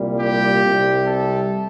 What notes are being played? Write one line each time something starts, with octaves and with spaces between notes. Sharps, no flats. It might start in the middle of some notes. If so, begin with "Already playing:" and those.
Already playing: C2 A#2 G3
G4
C2 C3 G3
A4